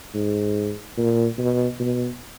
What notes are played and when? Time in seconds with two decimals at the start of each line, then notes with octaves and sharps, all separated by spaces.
0.14 G#2
0.97 A#2
1.38 B2
1.80 B2